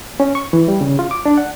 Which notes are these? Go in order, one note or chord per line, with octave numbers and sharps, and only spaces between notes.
C#4
C#6
E3
G3
C#3
F4
D6
D4
F#5